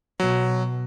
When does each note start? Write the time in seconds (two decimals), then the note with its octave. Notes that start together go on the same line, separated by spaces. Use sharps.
0.20 B2 F#3